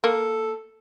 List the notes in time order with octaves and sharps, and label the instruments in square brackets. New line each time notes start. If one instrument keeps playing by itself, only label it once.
[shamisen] A#3 [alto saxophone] A4